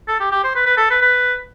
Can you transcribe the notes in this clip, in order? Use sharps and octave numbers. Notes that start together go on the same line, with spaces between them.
A4
G4
G4
C5
B4
B4
A4
B4
B4